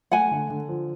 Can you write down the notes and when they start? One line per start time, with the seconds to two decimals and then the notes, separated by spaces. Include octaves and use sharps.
0.11 A3 F#5 G#5
0.31 D3
0.50 D3
0.69 F3